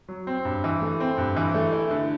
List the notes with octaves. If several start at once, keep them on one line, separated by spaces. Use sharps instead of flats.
F#3
C4
G2
E3
A3
C4
G2
E3
A3
E4
D3